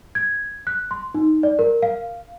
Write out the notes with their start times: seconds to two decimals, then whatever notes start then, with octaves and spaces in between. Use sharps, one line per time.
0.15 G#6
0.67 F#6
0.91 C6
1.15 D#4
1.43 D5
1.59 A#4
1.82 F5